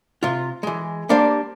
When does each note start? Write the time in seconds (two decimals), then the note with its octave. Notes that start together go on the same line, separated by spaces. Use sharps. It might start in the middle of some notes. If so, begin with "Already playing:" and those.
0.23 C3 F4
0.63 E3 G#3
1.09 G3 A#3 D4 G4 C5 D5